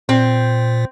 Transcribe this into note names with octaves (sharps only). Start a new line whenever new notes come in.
A#2 C4